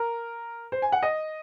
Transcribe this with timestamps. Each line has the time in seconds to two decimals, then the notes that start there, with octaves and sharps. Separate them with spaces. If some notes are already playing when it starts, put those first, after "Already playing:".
Already playing: A#4
0.72 C5
0.82 G#5
0.92 F#5
1.03 D#5